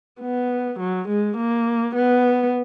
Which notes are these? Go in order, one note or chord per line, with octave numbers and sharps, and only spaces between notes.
B3
F#3
G#3
A#3
B3